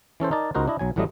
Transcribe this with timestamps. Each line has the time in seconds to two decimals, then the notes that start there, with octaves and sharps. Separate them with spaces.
0.20 E3 C#4 A4 C5
0.31 D#4 A#4 D5 A5
0.55 C#2 D#4 F#4 A#4 C5
0.68 D4 E4 D#5
0.79 B1 F#3 G#5
0.96 A1 A2 F#3 G3 A3 D#5